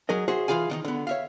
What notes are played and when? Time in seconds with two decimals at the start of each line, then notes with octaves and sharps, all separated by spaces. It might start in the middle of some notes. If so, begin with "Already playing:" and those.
0.09 F#3 G#4 A#4 D#5
0.28 F#4 G#4 C5 E5
0.48 E3 F4 G#4 F5 G#5
0.70 D#3 D4 D#4
0.85 D3 B3
1.07 C#5 E5 F5